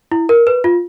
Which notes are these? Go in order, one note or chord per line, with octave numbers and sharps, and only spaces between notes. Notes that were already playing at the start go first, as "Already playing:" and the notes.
E4
A#4
B4
F4